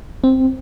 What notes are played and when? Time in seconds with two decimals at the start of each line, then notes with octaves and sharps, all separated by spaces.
0.24 C4